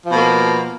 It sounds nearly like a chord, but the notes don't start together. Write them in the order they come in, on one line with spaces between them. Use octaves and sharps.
F3 B2 A#3